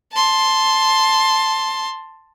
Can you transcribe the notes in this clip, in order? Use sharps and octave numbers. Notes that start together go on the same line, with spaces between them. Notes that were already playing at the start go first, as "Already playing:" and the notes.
A5 C6